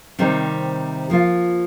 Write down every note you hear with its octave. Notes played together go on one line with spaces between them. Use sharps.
C3 D#3 G3 C4 D#4
F3 A#3 F4